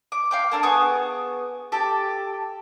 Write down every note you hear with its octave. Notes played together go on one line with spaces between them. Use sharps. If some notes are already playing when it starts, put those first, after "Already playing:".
D6
F5 G5 D6
A#3 D4 A4
B3 G#4 C#6 D#6
G4 A4 D6